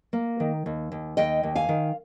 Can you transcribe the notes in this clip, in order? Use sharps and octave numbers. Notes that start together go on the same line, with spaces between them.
A#3
D#3
D#2
D#2
D#2 D#5 G5
D#2
F5 G#5
D#3